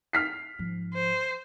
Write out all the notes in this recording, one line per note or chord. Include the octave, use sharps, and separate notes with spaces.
F6 B6 C7
G#2 F3
C5